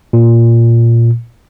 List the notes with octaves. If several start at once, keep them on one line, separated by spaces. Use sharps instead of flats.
A#2